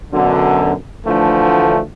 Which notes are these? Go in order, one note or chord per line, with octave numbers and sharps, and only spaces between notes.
F#2 B2 D3
D2 D3 E3 F3 A3